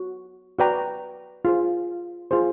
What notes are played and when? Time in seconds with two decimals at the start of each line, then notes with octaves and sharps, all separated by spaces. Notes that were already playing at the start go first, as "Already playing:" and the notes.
Already playing: F#4
0.59 F#4 B4 D5 G5 A#5
1.45 F4 G#4 C5
2.31 F4 G#4 C5